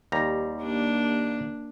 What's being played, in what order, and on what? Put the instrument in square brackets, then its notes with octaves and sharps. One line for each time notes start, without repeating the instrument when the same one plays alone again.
[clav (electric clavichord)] D#2 G3 A#5
[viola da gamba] A#3 D4